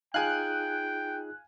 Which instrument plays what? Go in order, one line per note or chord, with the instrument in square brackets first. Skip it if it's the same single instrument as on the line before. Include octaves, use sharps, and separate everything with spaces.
[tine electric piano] D#4 F4 G#4 [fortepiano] F5 G#5 [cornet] G5 [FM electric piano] F#6